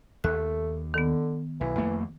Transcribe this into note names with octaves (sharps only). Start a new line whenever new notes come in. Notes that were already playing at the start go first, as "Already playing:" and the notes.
D#2 A3 F#6
D3 D#3 B3
B1 E3
F2 A3 A#3